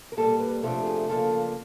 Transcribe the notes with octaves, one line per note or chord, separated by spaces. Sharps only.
A#4
A#2 G3 A#3 A4
B4
C3 F3 A3 D4 A4
G#4
C#3 F3 A#3 D4 A4